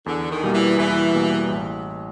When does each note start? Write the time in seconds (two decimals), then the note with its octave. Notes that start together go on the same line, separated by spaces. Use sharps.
0.06 E2 D3
0.31 D#3
0.43 B2 G3 A#3
0.54 E3
0.78 E2 E3
1.15 B2 G3 A#3
1.49 A1